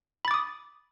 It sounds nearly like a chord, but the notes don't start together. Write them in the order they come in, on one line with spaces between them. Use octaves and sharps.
B5 A6 D6 D#6